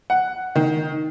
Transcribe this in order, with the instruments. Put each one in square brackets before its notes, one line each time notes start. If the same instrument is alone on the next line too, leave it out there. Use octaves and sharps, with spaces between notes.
[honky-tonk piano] F#5
D#3